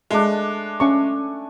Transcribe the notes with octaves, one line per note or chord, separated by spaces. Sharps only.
G#3 A3 D4
A3 C#4 D4 G#5 C#6